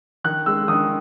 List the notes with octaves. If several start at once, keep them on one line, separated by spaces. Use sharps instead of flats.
D#3 F#6
G#3 E6
D#3 D#6